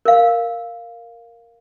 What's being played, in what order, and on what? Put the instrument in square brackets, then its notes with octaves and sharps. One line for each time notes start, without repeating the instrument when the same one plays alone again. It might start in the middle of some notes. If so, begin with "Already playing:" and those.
[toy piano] A#4 F5